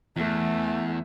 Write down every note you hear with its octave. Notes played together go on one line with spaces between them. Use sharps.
E2 A3